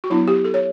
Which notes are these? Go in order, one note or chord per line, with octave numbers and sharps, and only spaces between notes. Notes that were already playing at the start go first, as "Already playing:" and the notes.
F#4
F#3 B3 D4 E4
G4
A4
C#5